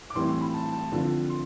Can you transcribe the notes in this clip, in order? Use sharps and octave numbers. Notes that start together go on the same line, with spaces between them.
D6
A2 E3 G3 C4 C6
C6
B5
A5
A5
D3 F3 C4 F4
C6